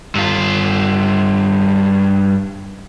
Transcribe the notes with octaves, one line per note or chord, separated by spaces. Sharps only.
G2 F4